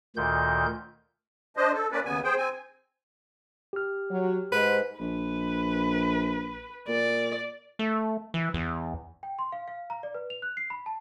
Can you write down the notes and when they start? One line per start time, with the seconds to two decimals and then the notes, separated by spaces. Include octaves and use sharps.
0.16 D2 A#2 D#3 G6
1.57 D4 C5 D#5
1.73 A4
1.92 A#3 C#4 B4 D5
2.05 D#2 C#3 B3 G#5
2.24 G#4 C5 G5
2.37 C4 G#5
3.73 G4 F6
4.11 F#3
4.52 G#2 B4
5.00 A#1 B4
6.88 A#2 D5
7.79 A3
8.34 E3
8.54 E2
9.23 G5
9.39 C6
9.52 F5
9.68 F5
9.90 A#5
10.03 D5
10.15 B4
10.30 F7
10.42 F#6
10.57 C7
10.70 B5
10.86 A5